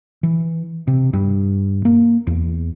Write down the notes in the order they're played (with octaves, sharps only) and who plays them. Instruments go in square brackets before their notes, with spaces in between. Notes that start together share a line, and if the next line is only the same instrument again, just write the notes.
[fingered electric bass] E3
C3
G2
A#3
E2